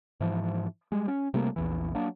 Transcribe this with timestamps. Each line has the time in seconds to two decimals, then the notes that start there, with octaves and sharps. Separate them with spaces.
0.20 G#2 E3 F3
0.92 G3 G#3
1.08 C#4
1.34 C3 G3 A3 A#3
1.56 A#1 E2 E3
1.95 F#3 A#3 D4